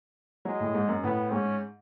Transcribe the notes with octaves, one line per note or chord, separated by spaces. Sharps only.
F#3 G#3
A2
G#2
F#2
A2 B3
G#2 C#4